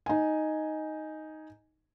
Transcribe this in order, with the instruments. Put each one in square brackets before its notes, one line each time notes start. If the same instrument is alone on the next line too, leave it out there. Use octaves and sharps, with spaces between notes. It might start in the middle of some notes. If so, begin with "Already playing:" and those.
[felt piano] D#4 G#5